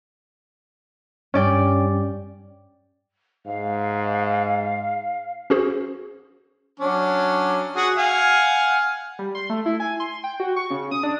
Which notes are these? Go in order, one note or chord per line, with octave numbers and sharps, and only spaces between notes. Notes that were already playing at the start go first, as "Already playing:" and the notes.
G2 C#4 D5 G5
G#2 F5
C#4 F#4 G#4 C5
F#3 C#4 D4
F#4 G#4 F#5
F5 F#5 G#5
G3
C6
A3
E4
G#5
C6
G5
F#4
C#6
C#3
D#6
D4